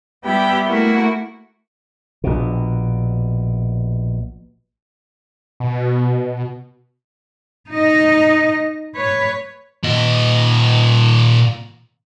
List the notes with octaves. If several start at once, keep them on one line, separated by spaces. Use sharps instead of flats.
G3 B3 E4 G4 G5 B5
A3 A#3 E4 F#4
A#1 B2
B2
D#4 D#5
B4 C#5
A#2 D#5